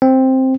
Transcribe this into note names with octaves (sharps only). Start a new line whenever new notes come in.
C4